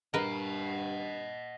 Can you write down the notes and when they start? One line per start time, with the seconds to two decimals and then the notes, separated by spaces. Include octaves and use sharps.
0.14 G2 A#4 B4 D#5 F#5